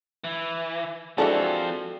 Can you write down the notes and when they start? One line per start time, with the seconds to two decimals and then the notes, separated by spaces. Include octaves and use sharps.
0.24 E3
1.18 E3 F3 G#3 C4 D4 F#4 A4 D5